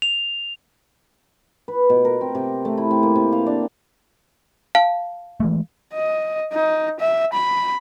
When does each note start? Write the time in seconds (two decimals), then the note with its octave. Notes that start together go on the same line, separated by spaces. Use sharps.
0.02 F7
1.68 B4
1.90 B2
2.05 A#4
2.21 C4
2.35 C3
2.65 A3
2.78 E4
2.91 C4
3.03 A#3
3.16 C3
3.32 F5
3.47 D4
4.75 F5 A5
5.40 E3 G#3 A3
5.93 D#5
6.53 D#4
7.00 E5
7.33 B5